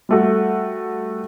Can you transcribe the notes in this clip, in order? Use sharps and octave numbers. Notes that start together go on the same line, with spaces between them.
G3 A3 F#4